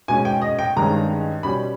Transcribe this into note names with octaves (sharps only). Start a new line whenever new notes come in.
B2 G#3 C#4 G#5
G5
D#5
G5
G2 D#3 G#3 C#4 A#5
B2 G3 C#4 B5